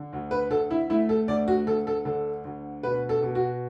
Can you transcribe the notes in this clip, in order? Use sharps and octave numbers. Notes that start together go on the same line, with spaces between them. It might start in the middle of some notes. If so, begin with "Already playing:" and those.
Already playing: D3
D2
B4
D2 A4
E4
A3 E4
A4
D2 D5
F#4
D2 A4
A4
D3 A4
D2
B2 B4
A4
B2
F#4